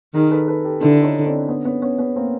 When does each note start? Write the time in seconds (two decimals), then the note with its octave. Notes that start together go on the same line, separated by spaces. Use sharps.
0.14 D#3 G#4 A#4
0.31 A4 B4
0.47 A4 B4
0.65 G4 A4
0.81 D3 D4 E4
1.03 C#4 D#4
1.26 C4 D4
1.49 B3 C#4
1.65 B3 C#4
1.82 B3 C#4
1.98 B3 C#4
2.16 A#3 C4